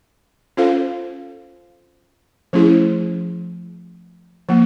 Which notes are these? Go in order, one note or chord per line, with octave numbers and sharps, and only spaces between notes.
C#4 F4 A4 C5 F5
F3 A3 C#4 E4 G#4
F3 A#3